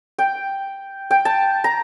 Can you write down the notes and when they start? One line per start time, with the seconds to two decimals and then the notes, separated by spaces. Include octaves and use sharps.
0.18 G5
1.11 G5
1.25 A5
1.64 A#5